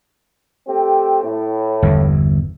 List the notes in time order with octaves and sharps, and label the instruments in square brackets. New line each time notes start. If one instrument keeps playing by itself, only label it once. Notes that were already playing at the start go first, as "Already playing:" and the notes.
[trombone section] A3 C4 G4
A2
[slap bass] G1 E2